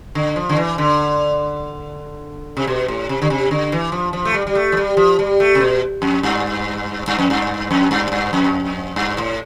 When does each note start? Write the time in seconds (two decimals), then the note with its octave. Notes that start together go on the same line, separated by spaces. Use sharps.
0.15 D3
0.36 F3
0.49 D3
0.57 E3
0.78 D3
2.57 C3
2.67 B2
2.88 A2
3.09 C3
3.22 D3
3.30 C3
3.51 D3
3.72 E3
3.92 F3
4.13 F3
4.25 A3
4.34 G3
4.47 G3
4.55 A3
4.72 F3
4.77 G3
4.97 F3
5.19 G3
5.40 A3
5.55 C3
5.60 B2
6.02 F2
6.23 G2
7.08 G2
7.18 F2
7.30 G2
7.71 F2
7.91 G2
8.12 G2
8.33 F2
8.96 G2
9.17 A2